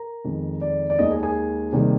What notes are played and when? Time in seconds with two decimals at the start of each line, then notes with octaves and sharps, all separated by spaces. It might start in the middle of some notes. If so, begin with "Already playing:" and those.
Already playing: A#4 A#5
0.25 F2 D#3 G#3
0.61 D5
0.90 D5
0.99 D#2 D#3 G#3 D#5
1.11 G#4 G#5
1.23 G#4 G#5
1.73 C3 D#3 G3 A#3